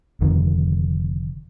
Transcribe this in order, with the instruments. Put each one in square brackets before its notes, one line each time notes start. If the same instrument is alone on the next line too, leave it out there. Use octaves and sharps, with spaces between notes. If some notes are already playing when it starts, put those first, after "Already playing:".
[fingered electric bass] F1 F2 D3 D#3